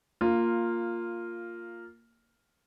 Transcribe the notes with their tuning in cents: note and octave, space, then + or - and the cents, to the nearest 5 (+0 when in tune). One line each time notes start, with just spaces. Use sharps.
A#3 -10 F4 +0